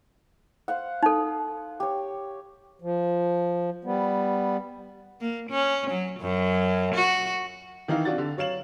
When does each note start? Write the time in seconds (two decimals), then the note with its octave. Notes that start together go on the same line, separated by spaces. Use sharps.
0.68 C5 F5 F#5
1.03 D#4 A4
1.80 G4 C#5
2.82 F3
3.85 G3 B3
5.21 A#3
5.50 C#4
5.91 F#3
6.20 F#2
6.95 F#4
7.88 D#3 E3 D#4 F5
8.05 C3 D4 F4 F#4 A6
8.18 D3
8.37 F#3 C#5 F5 E7 F#7